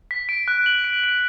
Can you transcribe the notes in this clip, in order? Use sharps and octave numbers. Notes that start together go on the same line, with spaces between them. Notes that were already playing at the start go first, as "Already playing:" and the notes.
B6
D7
F#6
F#7
D7
D7